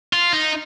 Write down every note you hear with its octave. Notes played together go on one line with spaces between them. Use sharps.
F4
D#4